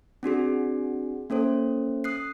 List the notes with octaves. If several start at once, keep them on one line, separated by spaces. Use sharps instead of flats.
C4 D4 F#4 G#4
A#3 C#4 A4 C5
D#6 F#6 C7